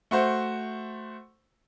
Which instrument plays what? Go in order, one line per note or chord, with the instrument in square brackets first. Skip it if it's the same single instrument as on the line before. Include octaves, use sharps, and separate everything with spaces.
[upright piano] A3 F#4 C5